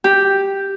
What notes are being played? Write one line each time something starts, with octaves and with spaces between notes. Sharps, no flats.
G4